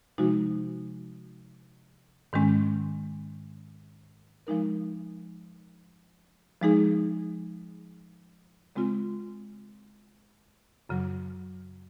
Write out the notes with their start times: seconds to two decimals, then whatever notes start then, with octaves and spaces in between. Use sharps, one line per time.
0.18 C3 F3 G#3 D#4 F#4
2.33 G#2 D#3 G#3 C#4
4.47 F3 G#3 D#4 A#4
6.61 F3 G#3 D#4 G#4
8.76 C#3 G#3 C4 F4
10.89 F#2 C#3 F#3